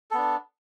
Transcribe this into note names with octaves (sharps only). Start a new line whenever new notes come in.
B3 D4 A4